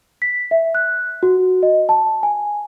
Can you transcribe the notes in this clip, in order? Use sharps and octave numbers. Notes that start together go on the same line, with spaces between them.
B6
E5
F#6
F#4
D#5
A5
G#5